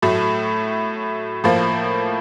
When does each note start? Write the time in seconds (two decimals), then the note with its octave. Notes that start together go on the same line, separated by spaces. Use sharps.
0.02 A2 F#3 A3
1.44 A2 F3 A#3